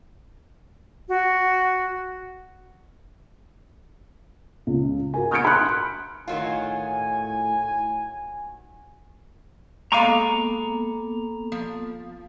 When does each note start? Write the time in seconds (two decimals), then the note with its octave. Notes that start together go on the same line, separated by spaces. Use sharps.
1.09 F#4
4.67 C#2
5.14 F#4 A#4 G#5
5.31 D#6 F6 G6 G#6 C#7 D7
5.45 B5 C6 F#6
6.28 A2 D#3 F#3 F4 G#5
9.92 G#3 A#3 B3 A4 F5 A#5 C#6 D6
11.52 F3